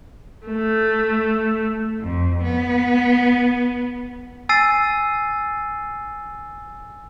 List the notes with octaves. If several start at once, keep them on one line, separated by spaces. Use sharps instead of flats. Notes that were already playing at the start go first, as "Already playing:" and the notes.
A3
F2
B3
G#5 E6 A6 C7 D#7